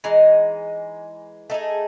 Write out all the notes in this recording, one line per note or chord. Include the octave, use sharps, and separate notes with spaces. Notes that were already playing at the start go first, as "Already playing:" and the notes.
E3 G#3 D#4
A3 D#4 G#4